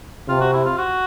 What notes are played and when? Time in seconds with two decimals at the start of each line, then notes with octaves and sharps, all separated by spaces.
0.28 C3 F4
0.41 F#4
0.53 E4
0.65 F4
0.78 F#4